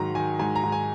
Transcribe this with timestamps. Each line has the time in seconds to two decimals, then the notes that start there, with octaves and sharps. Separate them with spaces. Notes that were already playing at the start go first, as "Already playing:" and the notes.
Already playing: G#2 D#3 F#3 A#5
0.15 D#3 G#5
0.39 G#2 G#5
0.56 A#5
0.63 G#2
0.72 G#5